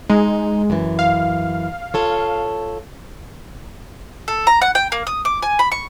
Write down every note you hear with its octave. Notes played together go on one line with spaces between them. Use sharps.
G#3 D#4
F#2 E3
F5
F4 A4 C#5
A4
A#5
F#5
G5
A#3
D#6
D6
G#5
B5
C#6